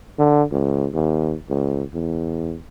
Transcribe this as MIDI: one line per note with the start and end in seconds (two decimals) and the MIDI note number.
0.19 0.43 50
0.52 0.89 37
0.94 1.36 39
1.49 1.83 37
1.94 2.58 40